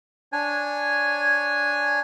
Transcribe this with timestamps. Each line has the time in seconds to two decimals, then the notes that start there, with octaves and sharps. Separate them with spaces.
0.33 D4 C#5 G#5